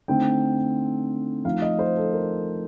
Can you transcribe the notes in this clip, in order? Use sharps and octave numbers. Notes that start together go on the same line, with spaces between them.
D3 A3 C4 D#4 G5
F3 A3 D#4 F5
D#5
C5
A4
A#4